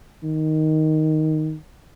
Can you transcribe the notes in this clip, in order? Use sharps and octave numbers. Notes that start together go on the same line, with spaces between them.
D#3